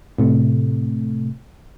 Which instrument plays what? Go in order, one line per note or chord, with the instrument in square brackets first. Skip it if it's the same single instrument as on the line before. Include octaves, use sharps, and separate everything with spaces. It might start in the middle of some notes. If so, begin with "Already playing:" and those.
[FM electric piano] A2 C3 A3